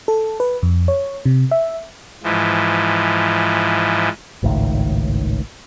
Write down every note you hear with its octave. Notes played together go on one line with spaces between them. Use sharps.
A4
B4
F2
C#5
C3
E5
G#2 E3 F3
G#1 C#2 A2 D#3